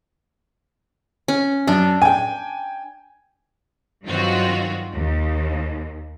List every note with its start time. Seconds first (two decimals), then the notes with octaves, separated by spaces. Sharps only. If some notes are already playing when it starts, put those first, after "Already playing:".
1.28 C#4
1.67 F#2 D4
2.02 G5 G#5
4.05 G2 D#3 F#3 C4 F4 F#4
4.94 D#2